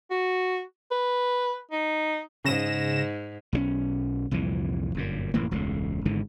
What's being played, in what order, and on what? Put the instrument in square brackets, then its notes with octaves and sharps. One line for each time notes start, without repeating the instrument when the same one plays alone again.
[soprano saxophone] F#4
B4
D#4
[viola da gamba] G#2 [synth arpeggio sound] C#3 A#6 E7
[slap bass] B1 F3 C#4
C2 F2 A#2 E3
G1 F#2 A#2
F1 A2 E3 A#3
E1 C#2 A2
G#1 G#2 D3 E3